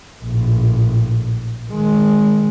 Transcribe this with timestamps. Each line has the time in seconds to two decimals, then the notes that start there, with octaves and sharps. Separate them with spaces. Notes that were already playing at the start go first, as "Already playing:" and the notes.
0.24 A#1 A2
1.70 D#3 G#3